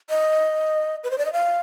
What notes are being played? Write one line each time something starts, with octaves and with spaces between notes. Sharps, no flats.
D#5
B4
C5
D5
D#5
F5